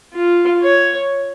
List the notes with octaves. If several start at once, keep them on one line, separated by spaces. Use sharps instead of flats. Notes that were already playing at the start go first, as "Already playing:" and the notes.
F4
C#5